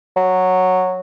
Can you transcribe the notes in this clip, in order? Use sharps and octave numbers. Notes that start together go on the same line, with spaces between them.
F#3